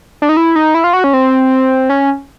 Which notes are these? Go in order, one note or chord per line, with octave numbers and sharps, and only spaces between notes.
D4
D#4
E4
D#4
E4
F4
F#4
C#4
C4
C#4